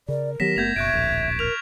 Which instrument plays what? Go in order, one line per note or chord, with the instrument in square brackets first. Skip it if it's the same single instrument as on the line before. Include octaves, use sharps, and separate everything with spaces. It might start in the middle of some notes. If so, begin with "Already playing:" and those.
[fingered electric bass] C#3 [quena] A#4 [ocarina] D5
[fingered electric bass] D#3 F#3 B3 [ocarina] G4 [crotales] A#6 B6 E7
[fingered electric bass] F#1 A3 B3 [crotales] G6 G#6 F7
[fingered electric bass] F#1 B2 [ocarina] E5 [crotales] C#6 F#6 D7 [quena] G#6
[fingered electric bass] D1 A#1
[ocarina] A#4 [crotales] F6 F7